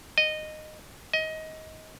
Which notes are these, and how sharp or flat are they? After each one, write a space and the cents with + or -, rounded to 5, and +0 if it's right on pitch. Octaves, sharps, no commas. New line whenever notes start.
D#5 -15
D#5 +20